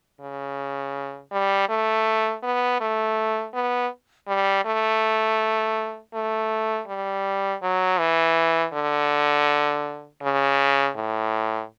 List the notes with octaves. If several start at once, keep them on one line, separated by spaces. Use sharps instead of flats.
C#3
G3
A3
B3
A3
B3
G3
A3
A3
G3
F#3
E3
D3
C#3
A2